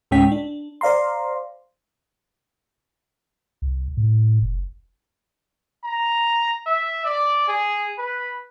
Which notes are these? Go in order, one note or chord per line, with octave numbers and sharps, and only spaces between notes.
D2 A2 G#3 C#4 G5 B6
D4
C5 D5 F5 A#5 C6
C2
A2
F1
A#5
E5
D5
G#4
B4